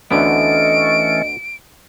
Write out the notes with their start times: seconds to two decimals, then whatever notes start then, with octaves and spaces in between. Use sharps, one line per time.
0.11 D2 D3 E3 A3 B3 C#4 D#5 D7